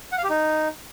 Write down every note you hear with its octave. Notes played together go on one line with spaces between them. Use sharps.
F#5
F5
G4
D#4